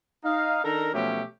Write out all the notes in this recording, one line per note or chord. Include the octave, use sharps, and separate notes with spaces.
D#4 F5
D#3 D4 A4 A#4 A#5
B2 F3 F#3 A3 C#4 G4